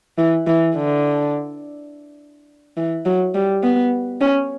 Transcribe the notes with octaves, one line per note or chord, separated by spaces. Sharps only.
E3
E3
D3
E3
F#3
G3
B3
C#4